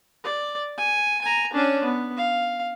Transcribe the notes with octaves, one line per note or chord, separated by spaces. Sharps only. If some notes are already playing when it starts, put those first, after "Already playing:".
D5
G#5
G#5 A#5
C#4 D4
B3
F5